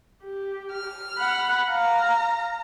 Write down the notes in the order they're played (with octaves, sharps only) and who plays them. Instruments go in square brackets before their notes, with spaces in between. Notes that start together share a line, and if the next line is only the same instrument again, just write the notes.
[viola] G4
[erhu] F6
[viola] F#5 B5
[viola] F5 [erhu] A#5